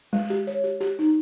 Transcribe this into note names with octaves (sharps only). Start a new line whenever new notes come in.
G#3
G4
C#5
G4
G4
D#4